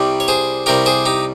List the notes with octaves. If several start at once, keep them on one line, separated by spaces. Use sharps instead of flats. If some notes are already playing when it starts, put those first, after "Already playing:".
Already playing: C2 C3 G3
C#5
G#4 C5
C2 C3 G3 G4 A#4
G#4 C5
D#4 G4